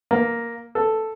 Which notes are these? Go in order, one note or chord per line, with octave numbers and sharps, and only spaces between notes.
A#3
A4